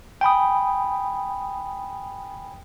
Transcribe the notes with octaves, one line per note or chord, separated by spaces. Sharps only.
G5 G#5 B5 D#6